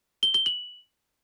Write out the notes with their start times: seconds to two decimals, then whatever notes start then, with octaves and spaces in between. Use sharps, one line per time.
0.23 G7
0.34 G7
0.46 F#7